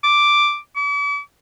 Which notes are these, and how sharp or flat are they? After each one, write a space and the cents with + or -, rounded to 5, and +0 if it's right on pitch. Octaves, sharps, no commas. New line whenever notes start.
D6 +0
D6 -45